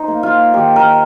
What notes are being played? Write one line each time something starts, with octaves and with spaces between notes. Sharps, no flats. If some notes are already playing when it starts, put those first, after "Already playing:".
Already playing: D#4 C5
A#3
F4
D#3 G4
A#4